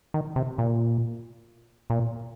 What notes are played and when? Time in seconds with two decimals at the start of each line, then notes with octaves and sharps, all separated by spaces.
0.14 D#3
0.36 C3
0.58 A#2
1.90 A#2